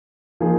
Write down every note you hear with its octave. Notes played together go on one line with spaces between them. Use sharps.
F3 A#3 D#4 G#4